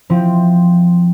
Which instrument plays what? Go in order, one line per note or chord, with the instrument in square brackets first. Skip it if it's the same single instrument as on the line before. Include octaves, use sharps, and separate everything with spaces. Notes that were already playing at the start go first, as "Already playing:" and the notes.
[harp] F3 C4 E4